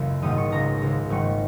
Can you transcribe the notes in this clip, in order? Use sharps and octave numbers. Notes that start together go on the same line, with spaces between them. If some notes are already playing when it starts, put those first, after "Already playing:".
Already playing: F#1 C#2 F#2 C#3
A#1 G#2 D#3 D#6
C#6
C#2 C#3 A#5
C#2 C#3
G#1 G#2 D#3 C#6